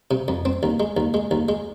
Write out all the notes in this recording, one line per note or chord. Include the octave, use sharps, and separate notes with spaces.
C3
F2
C4
D#2
G#3
D#2
G#3
D#2
G#3